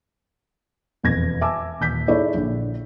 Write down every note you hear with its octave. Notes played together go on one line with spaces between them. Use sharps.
E1 F2 G#6 A#6
E5 G#5 A5 D6 E6
D#1 G6 B6
D#4 E4 G#4 A4 C#5 D5
A#1 D3